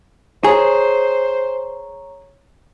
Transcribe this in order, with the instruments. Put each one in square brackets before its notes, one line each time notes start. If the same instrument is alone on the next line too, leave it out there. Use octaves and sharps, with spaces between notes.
[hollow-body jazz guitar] G#4 [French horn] C5 [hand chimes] C#5 A#5 C#6